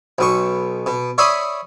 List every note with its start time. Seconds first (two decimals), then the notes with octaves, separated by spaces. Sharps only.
0.18 B1 B2 C#6
0.86 B2
1.18 C#5 D5 E5 B5 C6 D#6